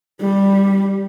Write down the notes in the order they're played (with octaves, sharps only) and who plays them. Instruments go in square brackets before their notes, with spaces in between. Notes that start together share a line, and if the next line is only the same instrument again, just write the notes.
[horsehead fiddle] G3